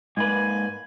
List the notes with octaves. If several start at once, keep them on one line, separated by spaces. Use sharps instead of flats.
G#2 A#3 B4 G#5